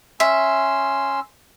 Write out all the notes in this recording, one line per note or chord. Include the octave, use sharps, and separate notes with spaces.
C#4 E5 C6 E6